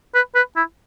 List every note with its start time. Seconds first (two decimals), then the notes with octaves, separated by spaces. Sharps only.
0.15 B4
0.35 B4
0.56 E4